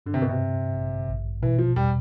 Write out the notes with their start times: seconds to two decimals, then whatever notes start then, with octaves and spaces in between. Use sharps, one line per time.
0.06 G2 D3
0.14 C3
0.22 B2
0.29 C3
0.40 G2
0.74 A1
1.09 A1
1.43 B2 E3
1.58 F3
1.75 E2 G3